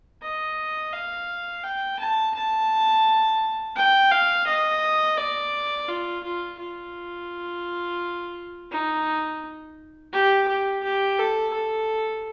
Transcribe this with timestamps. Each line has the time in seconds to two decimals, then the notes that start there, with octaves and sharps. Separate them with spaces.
0.22 D#5
0.93 F5
1.64 G5
1.99 A5
2.35 A5
3.76 G5
4.11 F5
4.47 D#5
5.17 D5
5.88 F4
6.24 F4
6.59 F4
8.72 D#4
10.12 G4
10.48 G4
10.84 G4
11.19 A4
11.53 A4